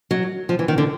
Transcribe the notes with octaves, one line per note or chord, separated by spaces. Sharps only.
F#3
F3
E3
D#3
D3